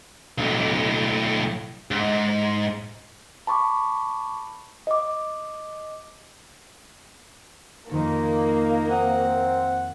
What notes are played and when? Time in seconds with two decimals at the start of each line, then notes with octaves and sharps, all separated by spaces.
0.38 B1 A2
1.91 G#2
3.47 A5 B5 C#6 D6
4.87 D#5 D6
7.89 F2 D#3 A#3 D#4 A4
8.90 C4 F5 F#5 D#6 F6